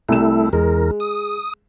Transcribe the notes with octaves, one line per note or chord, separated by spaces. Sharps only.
C2 A3 E4 E7
E2 G#3 A#4
D#6